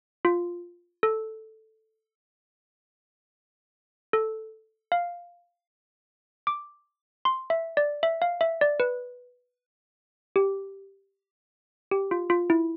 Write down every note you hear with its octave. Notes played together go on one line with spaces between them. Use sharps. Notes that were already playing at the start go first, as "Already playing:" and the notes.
F4
A4
A4
F5
D6
C6
E5
D5
E5
F5
E5
D5
B4
G4
G4
F4
F4
E4